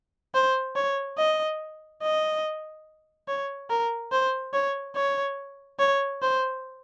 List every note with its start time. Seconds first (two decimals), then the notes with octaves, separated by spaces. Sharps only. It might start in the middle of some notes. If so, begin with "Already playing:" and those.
0.35 C5
0.76 C#5
1.18 D#5
2.02 D#5
3.28 C#5
3.70 A#4
4.12 C5
4.54 C#5
4.95 C#5
5.79 C#5
6.22 C5